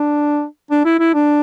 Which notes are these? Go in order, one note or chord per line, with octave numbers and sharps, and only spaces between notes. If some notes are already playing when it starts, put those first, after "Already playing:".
Already playing: D4
D4
E4
E4
D4